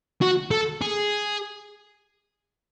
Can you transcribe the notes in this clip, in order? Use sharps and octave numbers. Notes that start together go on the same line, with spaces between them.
F#4
A4
G#4